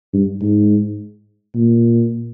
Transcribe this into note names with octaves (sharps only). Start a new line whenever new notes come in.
G2
G#2
A#2